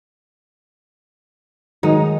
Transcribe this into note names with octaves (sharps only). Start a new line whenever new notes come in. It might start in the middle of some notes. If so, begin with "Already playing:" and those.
D#3 F#3 G#3 D#4